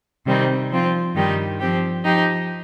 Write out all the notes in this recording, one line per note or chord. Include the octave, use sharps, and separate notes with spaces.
C3 D#3 G3 C4 D#4
F3 C4 F4
G2 D#3 G3 D#4 G4
F3 C4 G4
F3 D#4 G4